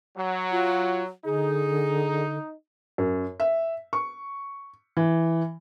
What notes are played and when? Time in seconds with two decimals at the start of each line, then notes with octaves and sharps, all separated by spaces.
0.18 F#3
0.51 F4
1.25 D3 D#4 G#4
2.98 F#2
3.40 E5
3.93 C#6
4.97 E3